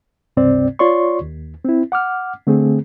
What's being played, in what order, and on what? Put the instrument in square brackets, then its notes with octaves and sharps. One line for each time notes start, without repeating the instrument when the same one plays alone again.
[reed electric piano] C#2 G2 C3 C4 D5
F4 C#5 D5 C6 C#6
D#2
C4 E4
F#5 D6 F6
D3 A3 C4 G#4